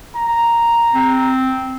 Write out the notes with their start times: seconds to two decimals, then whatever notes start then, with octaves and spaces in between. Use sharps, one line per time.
0.15 A#5
0.94 C4